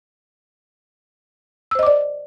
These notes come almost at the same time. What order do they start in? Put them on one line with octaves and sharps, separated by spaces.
E6 C5 D#5 D6 D5